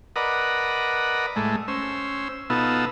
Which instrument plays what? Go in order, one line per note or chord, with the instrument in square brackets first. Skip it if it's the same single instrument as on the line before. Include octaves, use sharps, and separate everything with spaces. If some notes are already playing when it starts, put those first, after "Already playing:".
[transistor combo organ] A#4 B4 D5 D#5 F#5
A2 G#3 A3
C#4 C5 E6
B2 B3 D#4 F4 A4 E6